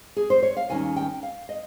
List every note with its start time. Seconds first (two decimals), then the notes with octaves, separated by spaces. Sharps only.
0.16 G#4
0.30 C5
0.43 C#5
0.57 F5
0.69 D#2 D#3 G3 C#4 G#5
0.96 G5
1.23 F5
1.49 D#5